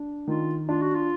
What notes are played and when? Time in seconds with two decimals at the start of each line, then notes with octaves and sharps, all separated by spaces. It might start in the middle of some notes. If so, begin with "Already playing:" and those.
Already playing: D4
0.27 D#3 F4
0.69 D4 F4
0.81 F#4
0.95 F4